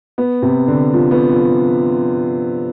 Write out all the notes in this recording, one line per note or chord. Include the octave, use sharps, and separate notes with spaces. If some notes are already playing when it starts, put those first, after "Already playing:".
B3
C3
D3
F3
B3
F3